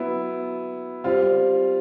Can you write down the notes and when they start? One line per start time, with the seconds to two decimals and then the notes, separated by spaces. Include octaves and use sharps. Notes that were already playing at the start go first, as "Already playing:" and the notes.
Already playing: F#3 B3 E4
1.04 G3 C4 F4